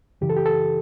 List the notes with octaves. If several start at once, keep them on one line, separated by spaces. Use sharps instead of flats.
F#2 C#3 E3 G4
A4
G4
A4